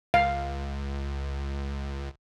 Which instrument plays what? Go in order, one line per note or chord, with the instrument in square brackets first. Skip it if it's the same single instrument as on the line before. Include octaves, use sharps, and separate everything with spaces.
[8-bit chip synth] C#2 [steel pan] F5